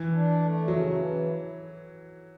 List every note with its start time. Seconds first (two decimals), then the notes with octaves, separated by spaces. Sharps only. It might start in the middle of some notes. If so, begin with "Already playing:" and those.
Already playing: E3
0.14 D4
0.42 A3
0.68 C#3 F#3
0.95 E3